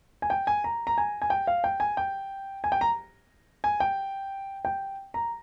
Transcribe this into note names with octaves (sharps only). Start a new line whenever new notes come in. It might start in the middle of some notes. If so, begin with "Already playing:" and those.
G#5
G5
G#5
A#5
A#5
G#5
G#5
G5
F5
G5
G#5
G5
G#5
G5
A#5
G#5
G5
G5
A#5